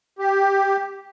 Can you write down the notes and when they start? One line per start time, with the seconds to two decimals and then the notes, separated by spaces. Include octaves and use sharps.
0.19 G4